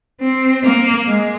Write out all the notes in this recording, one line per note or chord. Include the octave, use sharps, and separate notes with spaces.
C4
A#3
G#3